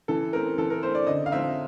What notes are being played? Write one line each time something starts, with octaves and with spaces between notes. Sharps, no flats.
E3 A4
A3 C4 A#4
E3 A4
A#4
A3 C4 C5
D5
D3 D#5
F5
F3 G#3 C4 D#4 E5